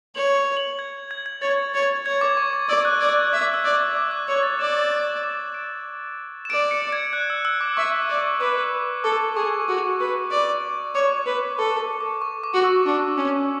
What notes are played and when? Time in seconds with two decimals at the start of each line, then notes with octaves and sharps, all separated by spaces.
0.15 C#5 F#7
0.57 F#7
0.79 G#6
1.11 G#6
1.26 G#6
1.42 C#5 A6
1.74 C#5
2.05 C#5 G#6
2.21 D6
2.37 C#6
2.53 D6
2.69 D5 E6
2.85 F#6
3.00 D5 G#6
3.33 E5 D6
3.54 E6
3.64 D5
3.75 D6
3.96 D6
4.11 F#6
4.27 C#5 F#6
4.43 A6
4.59 D5 E7
4.81 E7
5.02 E7
5.23 E7
5.54 D7
6.45 E7
6.50 D5 D7
6.71 C#7
6.92 G#6
7.13 F#6
7.30 E6
7.45 E6
7.61 D6
7.77 E5 C#6
8.09 D5
8.40 B4 D6
9.04 A4 D6
9.36 G#4 C#6
9.68 F#4
10.00 B4
10.31 D5
10.95 C#5 D6
11.26 B4
11.59 A4 C#6
11.80 D6
12.01 D6
12.22 C#6
12.44 D6
12.54 F#4
12.64 E6
12.86 D4
13.17 C#4